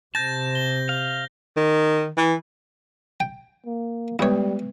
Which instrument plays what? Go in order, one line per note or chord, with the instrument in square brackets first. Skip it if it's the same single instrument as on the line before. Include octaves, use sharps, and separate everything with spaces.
[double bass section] C3 [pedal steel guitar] A5 [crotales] G6 A#6
[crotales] G7
[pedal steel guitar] F5
[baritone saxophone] D#3
E3
[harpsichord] G5
[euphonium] A#3
[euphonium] G3 [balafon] G#3 B3 B4 [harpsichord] E4 C#5